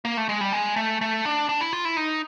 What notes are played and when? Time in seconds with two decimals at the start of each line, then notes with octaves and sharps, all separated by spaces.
0.05 A#3
0.17 A3
0.29 G#3
0.41 G3
0.53 G#3
0.76 A3
1.01 A3
1.25 D4
1.49 D4
1.61 E4
1.73 F4
1.85 E4
1.97 D#4